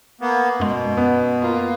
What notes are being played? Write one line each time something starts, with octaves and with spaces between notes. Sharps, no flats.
A#3 B3
F#2 B2 G#3
F#2 B3
A#3 F4